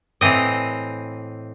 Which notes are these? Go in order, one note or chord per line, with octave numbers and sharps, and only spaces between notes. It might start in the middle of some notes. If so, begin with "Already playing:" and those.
A2 E3 C4 D#5